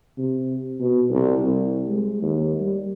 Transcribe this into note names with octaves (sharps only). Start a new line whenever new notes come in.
C3
B2
C2
C2
G#3
D#2
G3